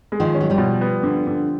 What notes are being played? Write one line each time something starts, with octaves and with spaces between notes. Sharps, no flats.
G#3
D#3 F3
C#4
F#3
F3 G3
B2
B3
D3
D3